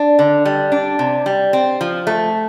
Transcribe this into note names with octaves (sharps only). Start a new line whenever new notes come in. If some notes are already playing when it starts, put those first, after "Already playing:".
Already playing: D4
D3
G3
D4
C3
G3
C4
F3
A3